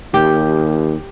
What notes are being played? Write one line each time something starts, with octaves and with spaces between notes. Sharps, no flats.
D#2 G4